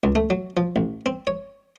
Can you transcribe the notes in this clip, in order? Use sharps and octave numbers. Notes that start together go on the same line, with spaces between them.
C#2
A3
F#3
F3
A1
C4
C#5